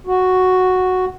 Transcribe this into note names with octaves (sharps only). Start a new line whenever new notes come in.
F#4